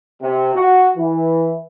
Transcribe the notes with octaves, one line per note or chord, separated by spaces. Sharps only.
C3
F#4
E3